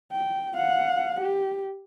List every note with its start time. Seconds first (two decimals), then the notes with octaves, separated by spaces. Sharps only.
0.12 G5
0.55 F5 F#5
1.21 G4